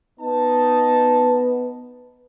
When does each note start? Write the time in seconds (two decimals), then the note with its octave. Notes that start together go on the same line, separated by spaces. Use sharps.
0.20 B3 D#4 A5